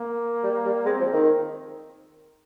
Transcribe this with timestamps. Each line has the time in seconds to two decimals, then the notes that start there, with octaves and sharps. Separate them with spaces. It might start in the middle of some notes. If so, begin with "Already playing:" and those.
Already playing: A#3
0.44 G3
0.65 G3
0.86 G#3 C4
1.00 F3
1.13 D#3